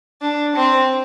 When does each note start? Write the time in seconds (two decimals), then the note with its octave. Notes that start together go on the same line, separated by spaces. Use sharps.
0.21 D4
0.56 C4